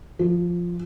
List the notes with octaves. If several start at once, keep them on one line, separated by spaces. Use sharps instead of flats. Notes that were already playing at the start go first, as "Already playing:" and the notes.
F3